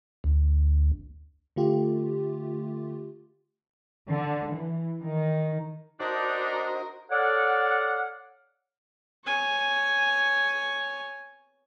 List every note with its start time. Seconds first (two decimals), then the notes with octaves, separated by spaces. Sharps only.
0.24 D2
1.56 D3 A3 F4 G4
4.09 D3
4.54 E3
5.03 D#3
6.00 D4 D#4 F#4 A#4 C5 D#5
7.11 A4 C#5 D5 F5 F#5
9.25 C#5 G#5